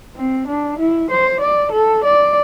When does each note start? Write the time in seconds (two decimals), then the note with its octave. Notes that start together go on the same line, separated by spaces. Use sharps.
0.16 C4
0.47 D4
0.79 E4
1.10 C5
1.40 D5
1.72 A4
2.04 D5